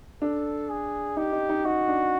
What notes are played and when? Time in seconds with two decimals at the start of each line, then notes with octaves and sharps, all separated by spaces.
0.22 D4 A4
0.70 G#4
1.17 D#4 G4
1.33 D#4
1.49 D#4
1.65 D#4 F#4
1.88 D4